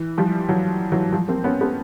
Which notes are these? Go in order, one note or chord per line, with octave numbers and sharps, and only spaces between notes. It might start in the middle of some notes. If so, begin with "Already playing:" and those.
Already playing: E3
F3 G3
E3 F#3
E3 F#3
F3 G3
A#3 C4
B3 C#4
A3 B3